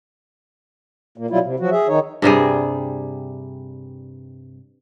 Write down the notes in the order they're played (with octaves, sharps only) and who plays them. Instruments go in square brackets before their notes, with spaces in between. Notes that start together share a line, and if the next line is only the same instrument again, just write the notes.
[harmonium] A#2 A#3
B2 F#3 G3 E4 F4
C3
F3 F#3 F#4
G#4 E5
D#3 D#4 C#5
[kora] G2 C3 G3 G#4